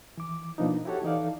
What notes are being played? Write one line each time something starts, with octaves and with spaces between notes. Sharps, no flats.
E3 D6
B2 F3 A#3 B3 D4 D#4
E4 F#4 G4 A4 C#5 F#5
E3 D#4 A4 D5 F5